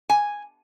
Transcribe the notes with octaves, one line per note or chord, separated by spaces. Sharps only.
G#5